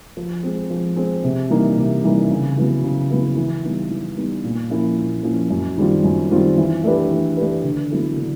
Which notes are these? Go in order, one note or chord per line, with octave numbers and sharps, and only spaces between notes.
F3
G#3 C4
F3
G#3 C4
C3
E3 G3 A#3 D#4
C3
E3 G3 A#3 D#4
C#3
F#3 B3 E4
C#3
F#3 B3 E4
E3
G3 B3 D#4
E3
G3 B3 D#4
A#2
F3 A#3 C#4 E4
A#2
F3 A#3 C#4 E4
F#2
D#3 G3 C4 F4
F#2
D#3 G3 C4 F4
E3
A3 D4 G4 B4
E3
A3 D4 G4 B4
D3
F#3 B3 E4 A4
D3